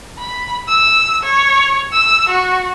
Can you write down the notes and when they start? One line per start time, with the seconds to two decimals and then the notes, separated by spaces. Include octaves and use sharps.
0.19 B5
0.68 E6
1.23 C#5
1.92 E6
2.29 F#4